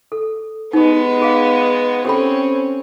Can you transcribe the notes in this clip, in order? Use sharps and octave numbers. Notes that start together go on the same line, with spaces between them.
A4
G#3 B3 D#4 G4
G#4 F5
C4 C#4 G4 A4 B5